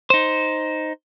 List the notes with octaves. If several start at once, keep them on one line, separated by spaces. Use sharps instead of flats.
D#4 C5